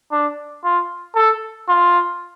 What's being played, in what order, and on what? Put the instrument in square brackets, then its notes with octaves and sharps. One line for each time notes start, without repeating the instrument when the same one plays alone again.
[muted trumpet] D4
F4
A4
F4